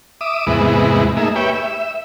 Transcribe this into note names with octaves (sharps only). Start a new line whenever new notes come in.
E5 D6 D#6
E2 G#2 C3 G#3 B3 E4
A3 A#3 D#4 G#4 E5
G4 B4 C#5 E5 G5
E5